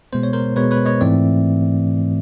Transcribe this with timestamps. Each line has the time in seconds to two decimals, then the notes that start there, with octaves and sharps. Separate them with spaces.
0.13 B2 G#3 B3 C5
0.23 C#5
0.33 A#4 C5
0.56 B2 G#3 B3 B4 C#5
0.71 B4 C#5
0.86 C#5 D#5
1.01 G#2 E3 A3 C4 D5 E5